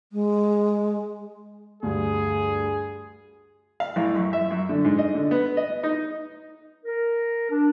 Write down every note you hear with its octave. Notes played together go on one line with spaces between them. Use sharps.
G#3
D2 G2 G#4
F5
A1
F#2
E5
F#2
D3
G#2
D#5
D3
B3
D#5
D#4
A#4
D4